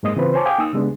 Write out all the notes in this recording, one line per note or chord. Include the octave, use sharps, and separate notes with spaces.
G#2 G#3 A#3 D#5 D#6
C#3 E3 C4 F4 B4 C5
C5 C#5 G#5 A5 D6
F5 G5 G#5 D6 D#6
A#3 D#4 D#6 E6
C#3 G3 G#3 B3 D4